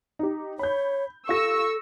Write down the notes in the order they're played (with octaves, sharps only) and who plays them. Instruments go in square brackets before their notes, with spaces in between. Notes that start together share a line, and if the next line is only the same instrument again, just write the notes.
[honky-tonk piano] D#4 G4
[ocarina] C#5 [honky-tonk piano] B5 G6
[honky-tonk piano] F4 G4 A#6 [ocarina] A4 [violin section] C#6 E6